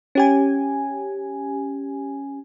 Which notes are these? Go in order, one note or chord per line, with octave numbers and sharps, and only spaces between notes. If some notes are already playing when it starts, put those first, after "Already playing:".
C#4 G4 G#5